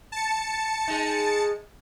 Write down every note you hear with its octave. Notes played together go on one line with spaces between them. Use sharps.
A5 C#7
G#3 D#4